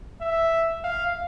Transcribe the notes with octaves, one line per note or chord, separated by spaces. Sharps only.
E5
F5